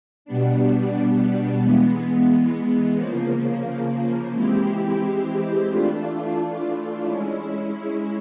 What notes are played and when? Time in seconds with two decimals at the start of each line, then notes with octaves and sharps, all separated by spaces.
0.25 B2 G3 B3 D4
1.61 E3 G#3 B3
2.97 C#3 F3 A#3
4.33 E3 G#3 C4 E4 G4
5.68 E3 A3 D4 F4
7.04 G#3 C#4 E4